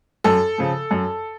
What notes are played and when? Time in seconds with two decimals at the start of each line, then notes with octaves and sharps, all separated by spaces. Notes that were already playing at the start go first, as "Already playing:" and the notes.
0.24 F#2 A4
0.58 C#3 F3
0.91 F#2